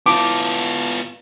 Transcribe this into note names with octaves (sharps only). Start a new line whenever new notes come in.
B3 E4 F4 A5 D6